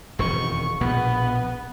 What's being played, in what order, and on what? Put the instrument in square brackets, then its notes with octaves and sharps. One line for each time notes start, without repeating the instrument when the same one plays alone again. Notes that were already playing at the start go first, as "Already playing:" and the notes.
[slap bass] E1 F2 D#3 [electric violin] C#6
[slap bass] A#1 B2 [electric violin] B3